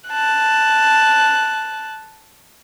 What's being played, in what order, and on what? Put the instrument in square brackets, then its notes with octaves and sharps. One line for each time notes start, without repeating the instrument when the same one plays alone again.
[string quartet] A5 F#6